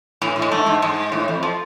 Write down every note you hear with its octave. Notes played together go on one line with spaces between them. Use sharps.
A2 E3
A2
G#3
G#2 A3
G#2
G#2 G#3
A2
F2
F3